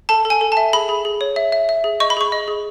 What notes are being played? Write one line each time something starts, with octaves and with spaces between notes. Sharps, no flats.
A4 A5
A4
G#5
A4
A5
E5
G#4 B5
G#4
G#4
C#5
E5
E5
E5
G#4
D#5 C#6
B5
G#4 C#6
D#5
G#4